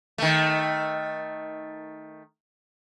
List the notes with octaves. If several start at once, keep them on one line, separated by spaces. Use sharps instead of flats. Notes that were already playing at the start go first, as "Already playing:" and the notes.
D#3 A3